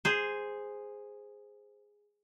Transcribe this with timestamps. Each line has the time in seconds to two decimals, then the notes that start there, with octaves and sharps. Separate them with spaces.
0.05 G#4 C5